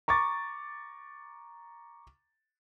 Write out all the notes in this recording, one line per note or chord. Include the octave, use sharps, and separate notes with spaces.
A#5 C#6 D6 A6